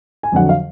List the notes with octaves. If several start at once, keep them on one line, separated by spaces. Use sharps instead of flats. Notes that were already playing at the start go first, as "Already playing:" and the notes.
G#5
F2 D3 F#3 F#5
F5